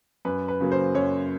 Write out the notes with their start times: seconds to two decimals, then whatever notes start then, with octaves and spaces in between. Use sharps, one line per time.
0.25 F#2 B4
0.48 B4
0.60 C#3 F#3 A#3
0.72 C5
0.95 F#2 C#5